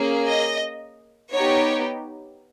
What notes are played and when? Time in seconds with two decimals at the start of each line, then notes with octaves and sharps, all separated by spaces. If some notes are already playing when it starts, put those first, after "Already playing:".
Already playing: A#3 C#4 G#4
0.25 D#5
1.32 B3 D#4 G4 C#5